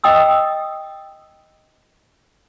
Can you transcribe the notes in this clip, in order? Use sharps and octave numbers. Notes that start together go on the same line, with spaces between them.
D#5 G5 D#6 E6